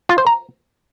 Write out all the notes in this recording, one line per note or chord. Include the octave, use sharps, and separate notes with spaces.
F4
C5
A#5